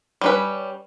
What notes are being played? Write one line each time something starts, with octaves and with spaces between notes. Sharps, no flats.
G3 C#4 B4